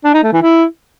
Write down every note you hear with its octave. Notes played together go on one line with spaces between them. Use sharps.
D4
D#4
A3
E3
E4